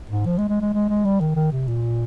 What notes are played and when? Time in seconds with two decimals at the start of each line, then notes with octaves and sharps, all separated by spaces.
0.10 G#2
0.26 F3
0.38 G#3
0.49 G#3
0.61 G#3
0.73 G#3
0.89 G#3
1.05 G3
1.20 D#3
1.36 D#3
1.52 C3
1.67 A#2